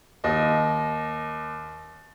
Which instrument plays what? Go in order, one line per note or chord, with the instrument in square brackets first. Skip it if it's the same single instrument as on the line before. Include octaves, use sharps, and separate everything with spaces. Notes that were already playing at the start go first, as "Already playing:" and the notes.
[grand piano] D#2 D#5